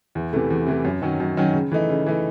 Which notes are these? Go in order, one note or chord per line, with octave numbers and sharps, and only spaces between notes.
E2
C3 E3 A3
E2
C3 E3 A3
F#2
D#3 F#3 C#4
F#2
D#3 F#3 C#4
C#3
E3 A3 D#4
C#3
E3 A3 D#4